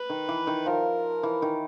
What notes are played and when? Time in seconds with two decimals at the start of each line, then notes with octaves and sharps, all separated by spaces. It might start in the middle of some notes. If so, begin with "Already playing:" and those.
Already playing: B4
0.10 D#3
0.29 E3
0.47 D#3
0.66 F3 A#4
1.23 E3
1.42 D#3